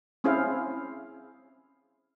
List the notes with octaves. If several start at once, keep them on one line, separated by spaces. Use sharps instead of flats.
C4 C#4 E4 G#4 C5 F5